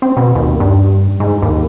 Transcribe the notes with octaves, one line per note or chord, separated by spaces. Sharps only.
C4
B2
D#2
G2
G#2
D#2